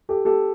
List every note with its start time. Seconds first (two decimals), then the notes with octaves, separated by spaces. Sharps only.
0.09 G4 A4
0.25 G4 A4